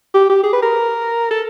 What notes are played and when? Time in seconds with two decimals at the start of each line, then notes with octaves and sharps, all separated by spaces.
0.14 G4
0.30 G4
0.43 G#4
0.53 B4
0.62 A#4
1.31 A4